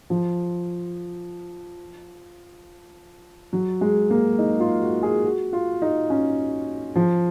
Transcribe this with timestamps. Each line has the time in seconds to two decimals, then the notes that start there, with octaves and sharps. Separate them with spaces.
0.10 F3
3.53 F#3
3.81 G#3
4.10 A#3
4.39 D#4
4.60 F4
4.82 F#4
5.03 G#4
5.24 F#4
5.53 F4
5.82 D#4
6.10 C#4
6.96 F3